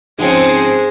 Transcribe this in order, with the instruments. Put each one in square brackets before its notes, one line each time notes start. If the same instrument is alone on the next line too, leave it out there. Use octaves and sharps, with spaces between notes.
[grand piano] G#2 F3 C#4 [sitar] G#3 [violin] C4 C#7 [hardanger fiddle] G#4 C5